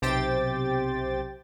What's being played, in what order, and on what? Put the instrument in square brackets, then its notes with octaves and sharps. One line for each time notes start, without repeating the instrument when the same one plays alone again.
[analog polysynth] B1 C3 G4 C5 G5 A6